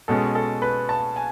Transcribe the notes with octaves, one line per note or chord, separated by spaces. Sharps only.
B2 G#3 C#4 A4
A4
B4
A5
G#5